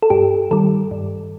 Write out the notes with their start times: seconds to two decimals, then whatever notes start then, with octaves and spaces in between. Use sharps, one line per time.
0.02 A4
0.10 G2 G4
0.51 D#3 G3 A4
0.91 G2